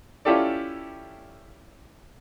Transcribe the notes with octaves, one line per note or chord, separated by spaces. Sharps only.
C#4 E4 F4 G4 A4 D5